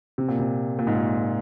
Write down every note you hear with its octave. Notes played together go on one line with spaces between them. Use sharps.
C3
A#2
C3
A#2
G#2
A#2